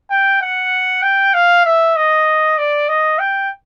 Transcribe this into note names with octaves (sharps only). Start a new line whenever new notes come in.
G5
F#5
G5
F5
E5
D#5
D5
D#5
G5